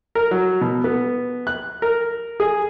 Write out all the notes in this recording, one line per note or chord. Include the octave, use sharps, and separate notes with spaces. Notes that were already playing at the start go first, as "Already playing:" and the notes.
A#4
F#3
B2
B3
F#6
A#4
G#4